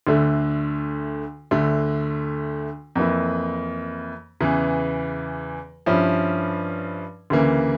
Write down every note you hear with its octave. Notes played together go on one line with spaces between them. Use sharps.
D2 D3 A3
D2 D3 A3
F2 E3 A#3 E4
E2 C#3 E3
G2 F3 C#4 E4
D2 C#3 E3 A#3